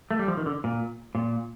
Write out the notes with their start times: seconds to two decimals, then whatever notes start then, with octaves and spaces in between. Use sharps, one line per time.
0.11 A3
0.19 G3
0.28 F3
0.37 D#3
0.46 D3
0.64 A#2
1.15 A#2